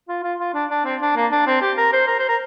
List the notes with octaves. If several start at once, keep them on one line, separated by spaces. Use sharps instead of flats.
F4
F4
F4
D4
D4
C4
D4
A#3
D4
C4
G4
A#4
C5
A#4
C5
A#4